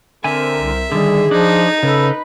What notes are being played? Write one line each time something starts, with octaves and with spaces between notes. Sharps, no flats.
D3 C4 A#4 E5 G#5
C2
D3 D#3 G3 G#4
F3 D4 D#4
C#3 A4 B4